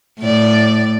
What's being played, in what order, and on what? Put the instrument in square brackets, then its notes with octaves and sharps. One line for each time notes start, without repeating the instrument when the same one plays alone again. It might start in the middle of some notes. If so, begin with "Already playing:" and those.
[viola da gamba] A2 D5